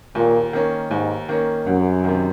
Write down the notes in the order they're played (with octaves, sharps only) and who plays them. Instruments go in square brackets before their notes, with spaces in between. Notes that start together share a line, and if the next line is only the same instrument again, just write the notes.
[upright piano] D#2 [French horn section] A#2
[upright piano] D#3 A#3 C#4
[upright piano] D#2 [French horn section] G#2
[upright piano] D#3 A#3 C#4
[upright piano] C2 [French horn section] F#2
[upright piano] C3 D#3